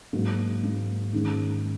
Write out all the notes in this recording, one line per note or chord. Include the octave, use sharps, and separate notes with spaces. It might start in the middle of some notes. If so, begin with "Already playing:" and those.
G#2 F#3 A#3
G#2 F#3 A#3
G#2 D#3 G#3 C#4